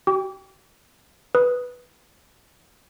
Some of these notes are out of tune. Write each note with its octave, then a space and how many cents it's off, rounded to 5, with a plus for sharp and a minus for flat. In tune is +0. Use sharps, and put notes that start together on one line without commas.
F#4 +45 G5 +15 D6 -30
B4 +0 D#6 +0